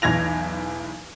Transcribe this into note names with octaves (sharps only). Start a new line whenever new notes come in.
B1 E2 G#6 A#6 F7